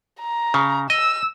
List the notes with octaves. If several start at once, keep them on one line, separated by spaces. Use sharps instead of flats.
A#5
C#3
D#5 E6